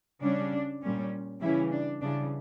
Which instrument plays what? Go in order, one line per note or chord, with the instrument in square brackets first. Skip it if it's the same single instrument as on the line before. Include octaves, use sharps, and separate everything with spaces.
[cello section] C#3 G3 C#4 D4
A#2 G3 C#4
C#3 E3 G3 C#4 E4
D4
C#3 E3 G3 D4